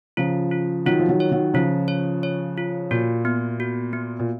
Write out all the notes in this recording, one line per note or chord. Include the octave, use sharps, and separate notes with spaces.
C#3 F3 F4
F4
D#3 F#3 F4
F3
D#3 F#3
C#5
D#3 F#3
C#3 F3 F4
C#5
C#5
F4
A#2 F#4
B3
F#4
B3
A#2